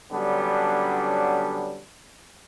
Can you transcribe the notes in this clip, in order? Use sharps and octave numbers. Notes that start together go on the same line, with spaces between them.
D3 F#3 G3 B3 C#4 D4